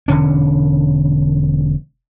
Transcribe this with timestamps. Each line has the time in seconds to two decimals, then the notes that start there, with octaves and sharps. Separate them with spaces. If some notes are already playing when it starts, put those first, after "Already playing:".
0.08 E1 D3 C#4